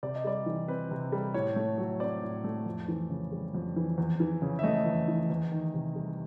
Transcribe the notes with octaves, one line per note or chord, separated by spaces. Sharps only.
C3 D5
D#5
G3 D5
E3
C4 B4
C3
G3
A2 C#5
A3
F#3
C4 D5
A2
A3
F2
E3
C#3
G3
F2
E3
E2
E3
C#3
E5
A3 D#5
E2
E3
E2
D#3
C3
G3